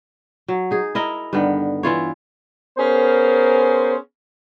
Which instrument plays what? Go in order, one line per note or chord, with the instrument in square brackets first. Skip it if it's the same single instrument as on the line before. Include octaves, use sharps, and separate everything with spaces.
[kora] F#3
D#4 G#4
E4 A#4 D#5
G2 D3 D#3 B3
E3 E4 F4 C#5
[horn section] B3 C#4 G#4 A#4 C5